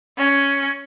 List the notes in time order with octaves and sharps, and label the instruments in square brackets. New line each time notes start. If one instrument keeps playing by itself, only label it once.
[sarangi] C#4